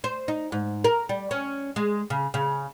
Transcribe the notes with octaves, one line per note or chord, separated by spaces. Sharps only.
C5
D#4
G#2
A#4
G3
C#4
G#3
C#3
C#3